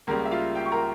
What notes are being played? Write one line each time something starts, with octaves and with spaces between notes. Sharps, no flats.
C#2 C#3 G3 A#3 A#4
E5
F4 F5
G4 G5
C#6
A#4 A#5